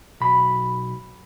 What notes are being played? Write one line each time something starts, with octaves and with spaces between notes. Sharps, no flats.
B1 B5